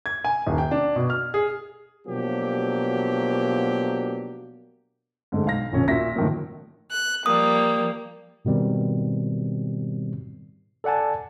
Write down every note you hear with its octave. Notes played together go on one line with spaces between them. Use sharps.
G#6
G#5
D#1
G5
D4
B2
F6
G#4
B2 F3 F#3 A#3 D4 G4
G#2 D3 G#3 A3
B1 F5 A#6
E1 A#1 D#2 C#4
A#2 F#4 E5 A#6 B6
A2 D3 D#3 F3 F#3 A#3
F#6
F3 G3 A#3 D#6
G#2 B2 D#3 G3 C4
A4 D5 F#5 G#5 A5